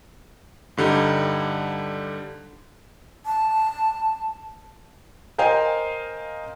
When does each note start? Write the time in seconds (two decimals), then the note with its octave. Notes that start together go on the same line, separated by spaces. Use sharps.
0.77 G2 D3 G3 D#4
3.26 A5
5.38 A#4 C5 D#5 F5 G5 G#5